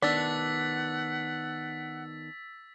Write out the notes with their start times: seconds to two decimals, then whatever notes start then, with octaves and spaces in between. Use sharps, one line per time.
0.02 D#3 B3 D4 F#5 E6 A6 B6